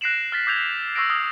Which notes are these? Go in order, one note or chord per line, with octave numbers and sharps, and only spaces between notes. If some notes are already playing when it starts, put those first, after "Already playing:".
F#6 A#6 C7 D7 E7 F#7
F6 A6 B6
D6 E6 G6 G#6 C7 F7
C#6 E6 F6 A#6 C7 D7
D#6 F6 G#6 C7